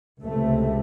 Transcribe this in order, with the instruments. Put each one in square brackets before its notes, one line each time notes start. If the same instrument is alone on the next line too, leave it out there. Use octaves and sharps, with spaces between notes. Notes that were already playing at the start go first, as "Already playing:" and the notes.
[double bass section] C#2 C3 A3